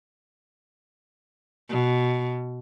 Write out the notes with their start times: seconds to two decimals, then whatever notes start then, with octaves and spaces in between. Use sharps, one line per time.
1.69 B2